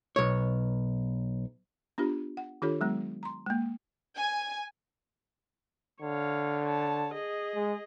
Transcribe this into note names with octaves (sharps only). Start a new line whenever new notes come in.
B1 C#5
B3 D4 F4 G4
F#5
D#3 D4 F4 G4 A4 C#5
F#3 G#3 B3
A#5 C6
G#3 A#3
G#5
D3 C#5 F5
C#5 A5
G#4 D#5
G#3